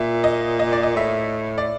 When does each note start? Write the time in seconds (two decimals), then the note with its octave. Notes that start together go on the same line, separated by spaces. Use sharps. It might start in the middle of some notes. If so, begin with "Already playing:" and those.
Already playing: A#2 E5
0.24 D#5
0.59 D#5
0.72 D5
0.83 D#5
0.95 A2 E5
1.58 D5